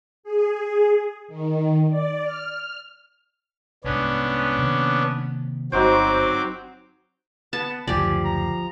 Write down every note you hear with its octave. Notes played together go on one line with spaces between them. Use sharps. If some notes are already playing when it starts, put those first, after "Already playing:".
G#4
D#3
D5
F6
C2 G#2 B3 C#4 D4
C3 D#3 A#3
G1 F#3 C4 D#4 F#4 C5 D6
B3 A5
F#1 D2 F3 G4 D5 G#5
A#5